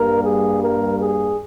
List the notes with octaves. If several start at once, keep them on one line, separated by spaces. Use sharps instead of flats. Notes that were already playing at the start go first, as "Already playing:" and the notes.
Already playing: G2 G3 A#3 A#4
G#4
A#4
G#4